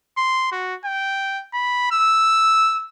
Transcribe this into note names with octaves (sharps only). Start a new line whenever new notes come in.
C6
F#4
G5
B5
E6